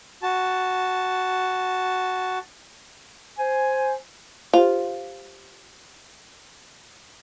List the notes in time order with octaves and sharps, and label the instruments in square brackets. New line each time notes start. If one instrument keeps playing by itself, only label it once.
[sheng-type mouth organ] F#4 A5
[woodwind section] C5 G#5
[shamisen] F4 [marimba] G4 C5